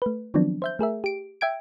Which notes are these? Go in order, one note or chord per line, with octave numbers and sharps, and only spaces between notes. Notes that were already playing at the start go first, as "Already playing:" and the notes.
A3 B4
D#3 F3 F#3 B3 C4 D4
C5 E5 G6
A3 G#4 A#4 E5
G4 D7
E5 G5 G#6 D7